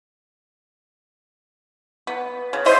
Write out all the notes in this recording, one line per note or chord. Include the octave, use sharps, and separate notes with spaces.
B3
C#3
C5 D#5 E5 C6